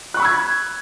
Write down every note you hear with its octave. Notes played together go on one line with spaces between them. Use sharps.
B5 C#6 E6 F#6 G#6